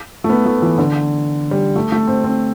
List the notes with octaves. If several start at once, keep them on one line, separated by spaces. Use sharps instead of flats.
A3
B3
A3
E3
D3
G3
A3
A3
C4
C4